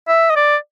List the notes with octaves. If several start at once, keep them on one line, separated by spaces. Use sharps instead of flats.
E5
D#5
D5